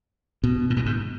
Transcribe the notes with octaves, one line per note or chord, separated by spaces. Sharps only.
B2
G#2
A#2
G#2